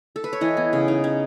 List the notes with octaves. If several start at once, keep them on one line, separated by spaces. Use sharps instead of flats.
A4
B4
C#5
E3 D#5
B3
C#3
D#4
C#4